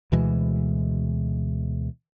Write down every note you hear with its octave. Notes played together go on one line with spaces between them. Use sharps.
D2 B2 E3 G#3